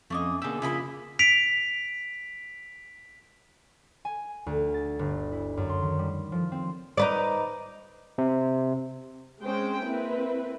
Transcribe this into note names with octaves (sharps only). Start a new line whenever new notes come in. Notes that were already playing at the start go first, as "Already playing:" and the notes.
F2 A3 A#3 C#4 D#5
B2 D3 A#3 G4 G#4 E6
C#3 F3 A#3 E4 F4 D#5 B5
B6 D7 F7
G#5
D2
A6
G1
E4
F#2
C6
D#3
G3
F3
C4
D#4 B4 D5
C3
G#3 C4 C#4 G#4 C5 G5
A#3 C4 E4 B4